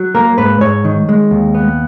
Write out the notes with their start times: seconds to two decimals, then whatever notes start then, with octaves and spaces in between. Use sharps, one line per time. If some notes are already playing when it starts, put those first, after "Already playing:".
Already playing: F#3
0.15 A#3 A#4
0.38 G#2 B4
0.61 G#2 C#5
0.84 D#3
1.09 G#3
1.31 D#2
1.55 B3